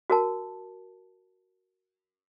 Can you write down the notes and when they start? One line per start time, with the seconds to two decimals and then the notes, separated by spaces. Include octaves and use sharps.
0.10 F#4 A#4 A5